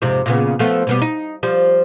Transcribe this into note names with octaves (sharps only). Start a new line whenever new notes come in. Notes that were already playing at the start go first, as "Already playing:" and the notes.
F2 G#2 C3
A#2 C#3 B3
F3 A3 B3
B2 G3 B3
D#4
F3 G3